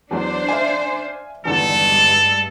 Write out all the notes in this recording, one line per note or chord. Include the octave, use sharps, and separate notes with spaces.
E2 F#3 D4 C5
E5 F5 G#5
E2 G2 D3 D#3 G#3 A4